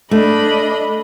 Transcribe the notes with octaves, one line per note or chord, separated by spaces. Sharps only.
A3 D4 D#5 B5